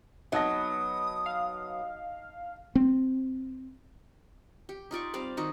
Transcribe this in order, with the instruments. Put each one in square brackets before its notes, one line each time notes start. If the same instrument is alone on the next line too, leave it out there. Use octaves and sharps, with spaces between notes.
[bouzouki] F#3 B3 [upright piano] D#4 A5 A#6 [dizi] D#6
[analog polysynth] F5
[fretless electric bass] C4
[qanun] G4
D#4 F4 D5 C#6
G3 C4 D5 F5
D#3 D#4 F#4